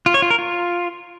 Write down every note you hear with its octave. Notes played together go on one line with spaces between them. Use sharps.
F4
C#5
F4
A#4
F4